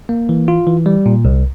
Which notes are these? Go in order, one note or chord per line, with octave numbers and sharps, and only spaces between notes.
A#3
E3
F4
E3
G3
A#2
C2